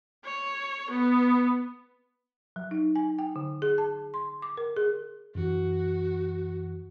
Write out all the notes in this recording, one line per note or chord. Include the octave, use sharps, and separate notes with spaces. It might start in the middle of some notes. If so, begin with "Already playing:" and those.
C#5
B3
F#3
D#4
G#5
G5
D3
G#4
A5
C6
D6
A#4
G#4
F#2 E3 F#4